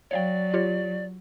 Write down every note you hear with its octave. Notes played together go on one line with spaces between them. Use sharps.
F#3 C#5 D5 F5 G5
F4 G4 C#5